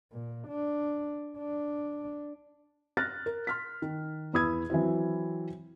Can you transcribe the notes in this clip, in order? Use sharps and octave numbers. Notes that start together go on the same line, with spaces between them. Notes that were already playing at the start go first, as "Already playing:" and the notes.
A#2
D4
D4
F6 F#6 A6 A#6
A#4
C6 F6 B6
D#3
E2 E4 B5 D#6 E6 G#6
E3 F#3 C4 E4